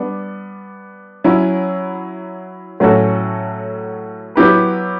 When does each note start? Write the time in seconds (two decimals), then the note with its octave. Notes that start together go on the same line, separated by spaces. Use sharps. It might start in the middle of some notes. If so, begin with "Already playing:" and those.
Already playing: G3 B3 D4
1.24 F#3 C#4 E4
2.80 A2 F#3 C#4 F#4 A4
4.36 F#3 B3 E4 G4 B4